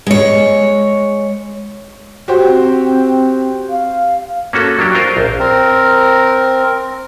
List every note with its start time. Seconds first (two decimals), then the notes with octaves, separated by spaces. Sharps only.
0.07 G#3 C#5
2.28 F#4 G4 C5
2.47 C4
3.70 F5
4.53 A#3 C#4 F#4 A4
4.79 F#3 D4 G4
4.95 F4 A#4 C5
5.17 A#1
5.39 C4 A#4